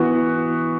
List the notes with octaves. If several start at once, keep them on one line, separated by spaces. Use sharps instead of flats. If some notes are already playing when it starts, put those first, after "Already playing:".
Already playing: E3 B3 F#4